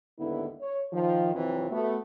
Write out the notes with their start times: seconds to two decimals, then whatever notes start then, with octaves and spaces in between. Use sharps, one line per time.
0.19 D#2 G#2 D3 A#3 B3 E4
0.61 C#5
0.93 D#3 F3
1.34 F2 C3 E3 F#3 C4
1.71 A3 B3 F#4